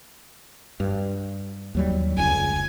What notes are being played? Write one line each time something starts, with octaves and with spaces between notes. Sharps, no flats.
G2
D#2 F#3 G3
F1 C#2 G#5